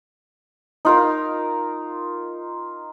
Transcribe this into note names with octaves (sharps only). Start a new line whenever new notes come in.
D#4 F4 A#4